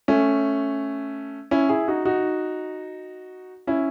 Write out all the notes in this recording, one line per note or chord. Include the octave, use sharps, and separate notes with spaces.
A3 C#4
C#4 E4
E4 G#4
D#4 F#4
D#4 F#4
C#4 E4